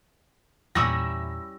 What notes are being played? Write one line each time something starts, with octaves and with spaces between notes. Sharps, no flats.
E2 A#2 G3 C#4 E4 E6 A#6